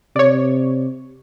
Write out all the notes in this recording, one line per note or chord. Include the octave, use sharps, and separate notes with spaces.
C3 C#5 D5